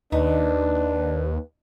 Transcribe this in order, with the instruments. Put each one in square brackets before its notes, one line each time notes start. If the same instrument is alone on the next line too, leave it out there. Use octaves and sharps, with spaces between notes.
[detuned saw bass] D#2 [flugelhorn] D4 [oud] D#4 [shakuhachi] B4